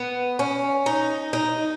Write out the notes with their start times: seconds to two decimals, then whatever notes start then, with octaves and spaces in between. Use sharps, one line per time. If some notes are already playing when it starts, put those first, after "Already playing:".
Already playing: B3
0.39 C#4
0.86 D#4
1.33 D#4